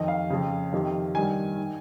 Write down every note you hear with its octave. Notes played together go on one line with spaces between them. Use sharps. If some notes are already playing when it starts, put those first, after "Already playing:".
Already playing: F2 D#3 D#5
F5
F2 C#3
F2 C3 D#3
G2 D#3 G#5
D#3